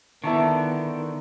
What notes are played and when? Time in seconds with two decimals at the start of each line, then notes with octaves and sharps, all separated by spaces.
0.24 D3 D#3 B3 E4 A5 C#6